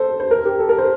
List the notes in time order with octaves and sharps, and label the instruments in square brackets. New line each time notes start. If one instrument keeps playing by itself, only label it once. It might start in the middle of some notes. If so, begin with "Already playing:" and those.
Already playing: [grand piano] A4 C5
C5
A#4
G4
A4
A#4
C5